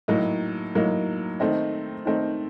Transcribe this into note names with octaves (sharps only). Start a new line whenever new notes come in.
A2 F#3 A#3 D#4
A2 F#3 A#3 D#4
D#3 A3 C4 D#4
D#3 A3 C4 D#4